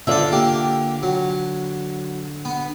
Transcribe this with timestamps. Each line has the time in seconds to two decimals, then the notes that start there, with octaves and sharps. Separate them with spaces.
0.07 D3 F4 A4 D5 E5
0.32 A#3 G4
1.03 F#3
2.45 B3